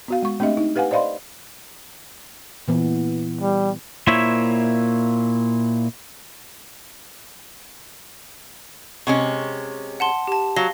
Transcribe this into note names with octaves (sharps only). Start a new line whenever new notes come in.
B3 F#4 F5
G#3 C#6
A3 C4 D4 G4 D#5 E5
D#4
G4 B4 F5 F#5 G#5
C5 D5 D#5 F5 B5 C6
A#2 E3 B3
G3
A#2 A#3 E4 C5 C#5 E5
C3 G#3 C#4 C#6
F#5 A5 C6
G4 A5
F#3 F5 A#6 G7